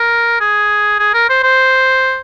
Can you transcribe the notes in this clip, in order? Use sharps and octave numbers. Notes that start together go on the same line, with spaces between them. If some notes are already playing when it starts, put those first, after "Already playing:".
Already playing: A#4
G#4
G#4
A#4
C5
C5